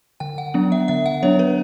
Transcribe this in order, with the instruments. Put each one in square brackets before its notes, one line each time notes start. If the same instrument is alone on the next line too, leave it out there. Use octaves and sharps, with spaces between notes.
[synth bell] D3 G5
F#5
F#3 B3 D4
E5
D3 E5
F#5
F#3 B3 D4 C#5
B4